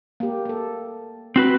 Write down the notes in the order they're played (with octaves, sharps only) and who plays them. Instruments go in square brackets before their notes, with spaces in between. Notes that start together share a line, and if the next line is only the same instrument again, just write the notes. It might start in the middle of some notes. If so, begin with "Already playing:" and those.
[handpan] A#3 G4
A#3 A4
[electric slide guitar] C4 F#4 B4